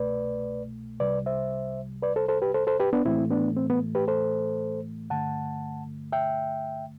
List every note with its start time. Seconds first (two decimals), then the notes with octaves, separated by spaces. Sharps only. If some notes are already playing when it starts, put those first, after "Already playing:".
Already playing: C2 B2 A3 B4 D5
1.00 C2 C3 G3 B4 D5
1.26 C5 E5
2.03 B4 D5
2.16 A4 C5
2.28 A4 C5
2.42 G4 B4
2.54 A4 C5
2.67 A4 C5
2.80 G4 B4
2.93 B3 D4
3.05 A2 E3 A3 C4 E4
3.31 B3 D4
3.56 C4
3.70 B3
3.95 G4 B4
4.08 A4 C5
5.10 G2 D3 A3 F#5 A5
6.12 E5 G5